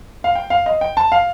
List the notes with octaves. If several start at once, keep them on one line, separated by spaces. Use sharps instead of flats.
F5
G5
F5
D#5
G5
A5
F5